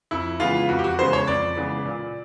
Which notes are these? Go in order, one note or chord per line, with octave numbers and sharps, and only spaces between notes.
F2 E4
C#3 E3 G#3 B3 F4
F2 F#4
G4
F#4
C#3 E3 G#3 B3 C5
C#5
F2 D5
C#3 E3 G#3 B3
A#2